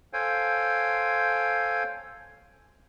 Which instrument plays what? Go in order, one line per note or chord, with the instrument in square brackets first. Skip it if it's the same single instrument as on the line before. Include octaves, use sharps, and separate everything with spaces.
[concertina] A4 C5 C#5 F5 G5 G#5